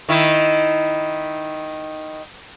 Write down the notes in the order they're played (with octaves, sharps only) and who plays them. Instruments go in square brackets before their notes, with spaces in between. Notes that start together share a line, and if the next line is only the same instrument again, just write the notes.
[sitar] D#3 E4